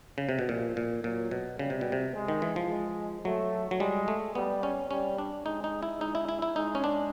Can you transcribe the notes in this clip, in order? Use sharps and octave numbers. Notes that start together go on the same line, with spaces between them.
C#3
C3
B2
A#2 F3
A#2
A#2 F#3
B2
C#3 G3
C3
B2
C3
G#3
D#3
E3
F3
G#3
F#3 A3
F#3
G3 G#3
A3
G3 B3
C#4
G3 C#4
D4
G#3 D#4
D#4
E4
G#3 D#4
E4
E4
E4
G#3 D#4
C#4
D4